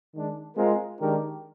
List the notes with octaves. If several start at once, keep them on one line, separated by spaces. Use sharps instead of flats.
D#3 G#3 D4
G#3 C4 F4 A#4
D#3 G#3 D4 G4 A#4